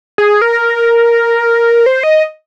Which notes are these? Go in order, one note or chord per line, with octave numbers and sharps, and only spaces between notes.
G#4
A#4
C5
D#5